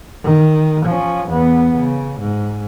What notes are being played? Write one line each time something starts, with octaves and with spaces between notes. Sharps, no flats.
D#3
F3 C#4
E2 B3
C#3
G#2